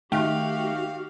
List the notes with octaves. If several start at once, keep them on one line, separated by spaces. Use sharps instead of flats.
D#3 A3 F#4 G4 F5 G5